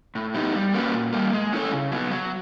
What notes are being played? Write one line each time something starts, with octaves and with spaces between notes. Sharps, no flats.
A2
F#3 B3 D#4 G4
G3
A#3 C#4 F#4 B4
A#2
G3 A#3
G#3
C#4 E4 A4 C#5
C#3
F#3 B3
F#3